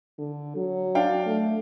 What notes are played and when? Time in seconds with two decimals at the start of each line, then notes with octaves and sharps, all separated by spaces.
0.18 D3
0.56 F#3
0.95 D4 F5 G5
1.26 A3